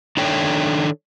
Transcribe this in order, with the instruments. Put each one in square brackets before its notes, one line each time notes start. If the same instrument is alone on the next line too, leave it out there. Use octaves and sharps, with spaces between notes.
[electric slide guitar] D#3 D4 A4 C#5 D5 G5